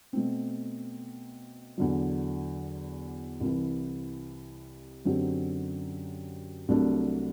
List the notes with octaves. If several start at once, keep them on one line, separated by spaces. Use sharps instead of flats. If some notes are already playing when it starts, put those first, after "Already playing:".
B2 A3 C4
E2 D3 F#3
C2 C3 E3
F#2 D3 F#3 C4 G4
C2 C3 F#3 A3 D4